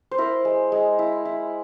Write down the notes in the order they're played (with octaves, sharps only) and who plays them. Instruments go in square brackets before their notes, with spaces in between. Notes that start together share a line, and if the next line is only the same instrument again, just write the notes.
[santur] C5
E4 A#4
G#3
G#3
E4
E4